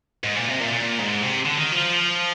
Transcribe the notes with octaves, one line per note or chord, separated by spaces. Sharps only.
G#2
A#2
C3
A#2
A#2
G#2
C3
D3
D#3
F3